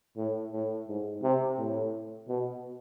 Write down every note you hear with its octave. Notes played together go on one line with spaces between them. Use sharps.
A2
A2
G#2
C3
A2
B2